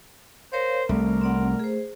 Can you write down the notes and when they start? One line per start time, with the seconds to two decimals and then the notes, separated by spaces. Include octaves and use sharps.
0.53 A#4 C5 C#5 F5
0.89 C2 A3 A#4 D5
1.21 C4 D5 F#5
1.59 G#4 C5